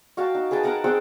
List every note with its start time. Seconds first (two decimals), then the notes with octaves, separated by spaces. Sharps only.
0.17 F#4 F5 G5 A5
0.35 D#4
0.51 G#4 B4 G5 A5
0.63 A#4 F#5 A5 A#5
0.84 C4 G#4 F#5 G5